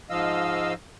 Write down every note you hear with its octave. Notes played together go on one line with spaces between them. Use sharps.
G#2 F3 D#5 F5 E6